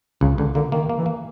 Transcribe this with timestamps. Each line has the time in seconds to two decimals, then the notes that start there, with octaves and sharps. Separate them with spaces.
0.21 C#2 C#3
0.38 C#2 D3
0.55 D3 A#3
0.72 D#3 A#3
0.89 A#3
0.98 E3
1.06 A#3